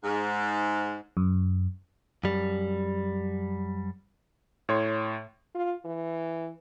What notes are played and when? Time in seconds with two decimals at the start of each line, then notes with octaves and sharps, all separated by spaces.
0.03 G#2
1.17 F#2
2.24 F#2 G3
4.69 A2 C#5 C6
5.55 F4
5.85 E3